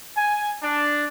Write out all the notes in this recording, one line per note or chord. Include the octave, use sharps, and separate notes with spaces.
G#5
D4